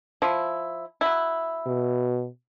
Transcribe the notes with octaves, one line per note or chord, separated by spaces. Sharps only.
F3 E4
F#3 E4
B2